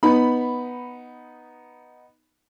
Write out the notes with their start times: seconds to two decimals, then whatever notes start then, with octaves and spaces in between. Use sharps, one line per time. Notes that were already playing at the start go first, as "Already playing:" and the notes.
0.03 B3 D#4 B5